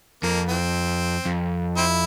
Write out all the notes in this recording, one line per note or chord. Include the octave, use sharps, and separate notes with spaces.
F2 A#3
E3 C4
F2
C4 E4